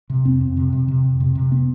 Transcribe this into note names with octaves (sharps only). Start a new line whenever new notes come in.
C3
F2 C4
F2
C3
C3
C3
F2
C3
C3
B3